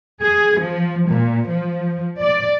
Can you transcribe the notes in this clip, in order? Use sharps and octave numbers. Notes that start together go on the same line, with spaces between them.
G#4
F3
A#2
F3
D5